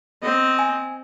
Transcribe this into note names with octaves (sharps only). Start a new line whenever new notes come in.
C4 D#5
G#5